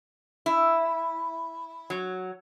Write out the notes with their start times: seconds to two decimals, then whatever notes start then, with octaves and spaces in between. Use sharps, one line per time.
0.46 E4
1.90 F#3